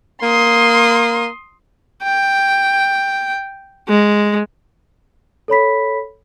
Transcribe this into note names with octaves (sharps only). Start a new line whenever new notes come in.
A#3 C6 D#6
G5
G#3
A4 C#5 B5 B6